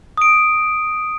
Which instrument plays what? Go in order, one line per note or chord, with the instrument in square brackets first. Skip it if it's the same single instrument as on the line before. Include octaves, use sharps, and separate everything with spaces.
[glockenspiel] D#6 D7